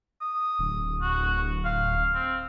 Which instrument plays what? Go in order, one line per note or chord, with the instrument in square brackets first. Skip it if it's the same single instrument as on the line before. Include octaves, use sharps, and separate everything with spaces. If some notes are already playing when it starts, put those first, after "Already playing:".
[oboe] D#6
[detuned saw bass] D1
[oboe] F#4
F5
C4